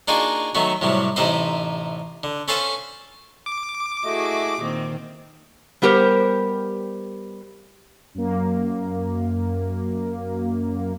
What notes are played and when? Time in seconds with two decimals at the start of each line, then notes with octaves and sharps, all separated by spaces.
0.08 A#3 D4 D#4 F4 F#4 G#4
0.55 D#3 F#3 A3 B3 F#4
0.82 A2 C3 F#3 G3
1.16 A1 C3 C4 D#4 B4 C5
2.23 D3
2.48 C#4 A4 B4 C5 F5 A5
3.46 D6
4.04 A3 E4 F#4 G#4 D#5
4.60 A#2 D#3 C4 D#5
5.82 G3 B3 G4 A#4 C5
8.15 F#2 A#3